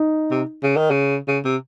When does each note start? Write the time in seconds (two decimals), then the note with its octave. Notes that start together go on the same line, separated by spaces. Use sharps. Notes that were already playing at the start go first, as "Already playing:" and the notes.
Already playing: D#4
0.31 C3
0.63 C#3
0.77 D#3
0.90 C#3
1.28 C#3
1.44 C3